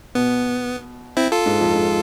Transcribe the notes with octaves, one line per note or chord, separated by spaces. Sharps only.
B2 B3
C4 E4
F4 A4
G#2
F2
G#2